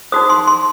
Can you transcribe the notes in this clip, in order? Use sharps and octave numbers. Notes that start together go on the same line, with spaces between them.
D#4 F#4 C5 D#6
C6
C6